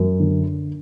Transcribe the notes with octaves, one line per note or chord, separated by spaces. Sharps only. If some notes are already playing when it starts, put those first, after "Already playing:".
Already playing: F#2
D3